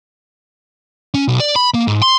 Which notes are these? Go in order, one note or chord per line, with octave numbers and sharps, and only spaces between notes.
C#4
B1
D5
B5
A#3
G#2
C6